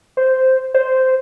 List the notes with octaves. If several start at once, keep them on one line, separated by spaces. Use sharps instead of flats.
C5
C5